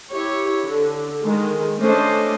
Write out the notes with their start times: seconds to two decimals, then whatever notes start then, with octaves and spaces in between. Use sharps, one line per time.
0.10 E4 G4 C#5
0.64 D3
1.23 D#3 G#3
1.79 A3 C#4 D4 C5 D#5